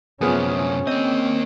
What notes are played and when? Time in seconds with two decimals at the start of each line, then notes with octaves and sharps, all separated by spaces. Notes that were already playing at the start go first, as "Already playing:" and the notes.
0.21 F#2 C3 F3 B3 C#4 G#4
0.87 A#3 C4 D#5